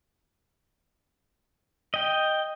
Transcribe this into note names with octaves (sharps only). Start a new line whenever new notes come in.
D#5 G5